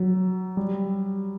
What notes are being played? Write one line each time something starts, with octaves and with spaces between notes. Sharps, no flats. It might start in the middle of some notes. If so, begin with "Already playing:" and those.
Already playing: F#3
G3